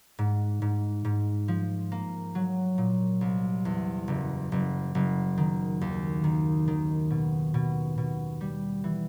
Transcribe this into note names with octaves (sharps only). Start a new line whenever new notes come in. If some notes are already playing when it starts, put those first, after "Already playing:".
G#2
G#2
G#2
F3
A#3
F#3
A#2
C2
E2
F#1
F#1
F#1
D#3
D#2
D#3
D#3
B2
B2
B2
G3
E3